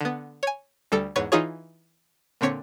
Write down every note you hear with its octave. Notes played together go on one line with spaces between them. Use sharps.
D3 B3
C#5 G#5
D2 G3 A4 C#7
E2 G#2 B4 C#5 G#6
E3 D#4 F4 G#4 C#5
A#2 D3 C4 C#5 B6 C#7